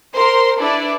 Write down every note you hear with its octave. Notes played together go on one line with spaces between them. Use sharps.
A#4 C5 C6
D4 E4 A4 B4 D5